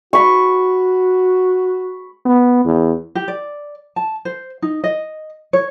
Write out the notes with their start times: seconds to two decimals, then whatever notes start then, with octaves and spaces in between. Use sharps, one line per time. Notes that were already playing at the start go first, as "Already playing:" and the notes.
0.13 F#4 B5 C#6
2.25 B3
2.65 E2
3.15 G4
3.28 D5
3.96 A5
4.25 C5
4.62 D#4
4.84 D#5
5.53 C#5